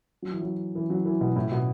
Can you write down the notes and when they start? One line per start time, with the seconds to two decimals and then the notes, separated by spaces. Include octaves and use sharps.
0.22 F#3
0.32 E3
0.42 F#3
0.75 E3
0.90 F#3
1.05 E3
1.21 B2
1.36 A2
1.52 B2